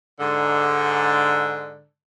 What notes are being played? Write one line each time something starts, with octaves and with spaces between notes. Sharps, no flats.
G#2 D3